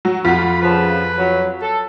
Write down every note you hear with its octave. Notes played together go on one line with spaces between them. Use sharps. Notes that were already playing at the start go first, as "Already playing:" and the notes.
F#3
F2 F4 F#4 B5
C#3 F3 B4
F#3
A4